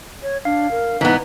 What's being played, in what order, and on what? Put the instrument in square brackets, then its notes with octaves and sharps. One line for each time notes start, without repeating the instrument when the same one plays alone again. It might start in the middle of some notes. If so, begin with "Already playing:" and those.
[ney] C#5
[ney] D4 [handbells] F5
[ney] A#4
[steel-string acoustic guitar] G#2 D#4 [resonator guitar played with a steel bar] E3 B3 [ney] A#5